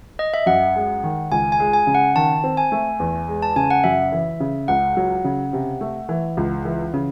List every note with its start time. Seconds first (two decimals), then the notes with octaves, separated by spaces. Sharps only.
0.19 D#5
0.34 E5
0.46 F#2 F#5
0.76 G#3
1.03 D#3
1.31 C#2 G#5
1.52 G#5
1.60 G#3
1.74 G#5
1.87 C#3
1.95 F#5
2.16 D#3 A5
2.44 C4
2.57 G#5
2.72 A3
3.00 E2
3.28 G#3
3.42 A5
3.56 C#3 G#5
3.70 F#5
3.84 F#2 E5
4.12 E3
4.40 C#3
4.68 C#2 F#5
4.97 F#3
5.25 C#3
5.53 C3
5.81 A3
6.09 E3
6.37 C#2
6.65 E3
6.94 C#3